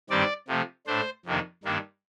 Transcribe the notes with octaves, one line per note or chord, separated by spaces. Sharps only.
G2 D#3 G3 C4 D5
C3 F3 A3
A2 A3 D4 C5
F2 C3 D#3 A#3 D4
G2 D#3 A#3 D4